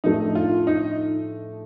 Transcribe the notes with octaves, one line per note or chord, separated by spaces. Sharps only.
A2 F3 A3 D4 D#4 A4
F4
D#4